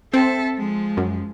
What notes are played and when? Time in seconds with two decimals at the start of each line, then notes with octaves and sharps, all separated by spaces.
0.14 C4 A4 E5
0.56 F3 G#3
0.97 F#2